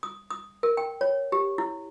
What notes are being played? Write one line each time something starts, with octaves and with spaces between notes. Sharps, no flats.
D#6
D#6
A#4
G5
C#5
G4
E4